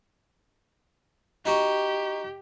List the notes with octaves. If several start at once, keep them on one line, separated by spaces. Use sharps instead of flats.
D#4 F#4 G4